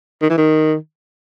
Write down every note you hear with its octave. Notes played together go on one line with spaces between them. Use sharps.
D#3
E3
D#3